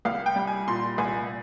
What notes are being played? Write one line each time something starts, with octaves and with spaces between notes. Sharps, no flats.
C2 F5
G5
G3
G#5
A#2 C6
C2 G#5